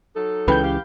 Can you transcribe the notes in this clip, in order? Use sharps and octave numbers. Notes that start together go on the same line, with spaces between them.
F#3 D#4 A4
C#2 C#3 E3 B4 G5 G6
G4 F5